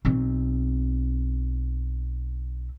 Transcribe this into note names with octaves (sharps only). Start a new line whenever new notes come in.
B1 C4